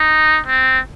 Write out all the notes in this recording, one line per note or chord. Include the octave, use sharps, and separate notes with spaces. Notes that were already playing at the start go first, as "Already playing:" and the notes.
Already playing: D#4
C4